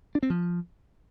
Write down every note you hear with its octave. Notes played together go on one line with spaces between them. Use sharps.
D4
C4
F3